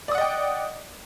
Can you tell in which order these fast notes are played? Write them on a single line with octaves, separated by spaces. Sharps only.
D5 D#6 F#5 D#5 G5